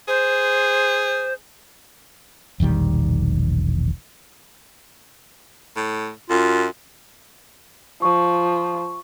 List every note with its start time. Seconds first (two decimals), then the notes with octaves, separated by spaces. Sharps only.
0.08 G#4 C5
2.60 E1 A#1 D#3 G3
5.76 A2
6.30 F#2 F4
8.02 F3 C#6